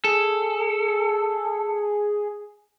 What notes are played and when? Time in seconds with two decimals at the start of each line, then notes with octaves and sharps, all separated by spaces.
0.05 G#4 A4